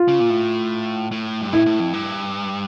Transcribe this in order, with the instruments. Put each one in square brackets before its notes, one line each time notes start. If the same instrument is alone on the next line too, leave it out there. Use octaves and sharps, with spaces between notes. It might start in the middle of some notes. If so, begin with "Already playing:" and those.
Already playing: [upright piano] F4
[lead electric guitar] C#3
A#2
A2
A2
G2
[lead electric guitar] A2 [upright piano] E4
[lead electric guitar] A2
F2
G2